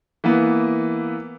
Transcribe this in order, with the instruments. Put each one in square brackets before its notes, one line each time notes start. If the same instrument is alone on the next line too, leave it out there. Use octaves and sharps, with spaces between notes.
[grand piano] E3 A#3 B3